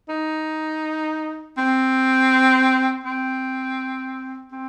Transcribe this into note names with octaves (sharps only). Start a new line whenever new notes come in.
D#4
C4
C4
C4